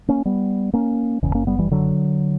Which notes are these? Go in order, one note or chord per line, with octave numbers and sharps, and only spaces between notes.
A#3 C#4
G3 B3
A#3 C#4
F#1 E2 C#3
A#3 C#4
G3 B3
E3 G3
D3 F#3